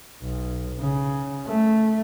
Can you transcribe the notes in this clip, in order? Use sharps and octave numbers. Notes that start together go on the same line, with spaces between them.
B1
C#3
A3